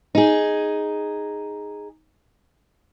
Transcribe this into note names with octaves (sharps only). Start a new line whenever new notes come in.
D#4 G#4